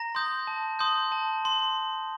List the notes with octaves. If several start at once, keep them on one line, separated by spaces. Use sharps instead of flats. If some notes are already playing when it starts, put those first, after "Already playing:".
Already playing: A#5 A#6
C6 D#6 G6
A5
C6 D#6 G6
A5
C6